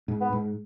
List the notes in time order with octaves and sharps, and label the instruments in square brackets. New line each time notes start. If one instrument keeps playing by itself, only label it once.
[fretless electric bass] G#2
[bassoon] B3
[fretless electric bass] G#2